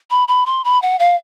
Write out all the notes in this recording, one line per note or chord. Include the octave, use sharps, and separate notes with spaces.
B5
B5
C6
B5
F#5
F5